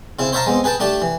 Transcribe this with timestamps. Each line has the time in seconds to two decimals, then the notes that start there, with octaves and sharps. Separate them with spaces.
0.19 C#3 C4 E4
0.32 C5 C#5 E5 F5 A5 A#5
0.46 G#3 B3 C4
0.64 G#4 B4 G5 A5
0.80 A3 D4 G4 A5
1.02 E3